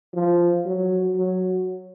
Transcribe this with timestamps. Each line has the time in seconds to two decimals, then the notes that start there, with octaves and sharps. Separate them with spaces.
0.14 F3
0.66 F#3
1.16 F#3